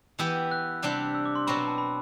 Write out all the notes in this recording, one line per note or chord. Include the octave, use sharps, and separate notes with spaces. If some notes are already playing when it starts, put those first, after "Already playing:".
E3 B3 E4 G4 E6
F#6
C3 G3 D4 G4
E6
D6
C6
B2 F#3 C4 F#4 B5
B5
A5
B5